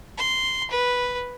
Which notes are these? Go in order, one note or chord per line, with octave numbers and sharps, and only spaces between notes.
C6
B4